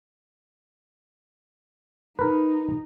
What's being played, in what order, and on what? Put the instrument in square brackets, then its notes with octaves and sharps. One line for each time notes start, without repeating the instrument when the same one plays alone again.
[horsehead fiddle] D#4 [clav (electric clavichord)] A#4 B4